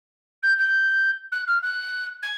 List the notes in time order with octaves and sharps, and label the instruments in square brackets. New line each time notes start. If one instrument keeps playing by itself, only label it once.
[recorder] G6
G6
F#6
F6
F#6
G#6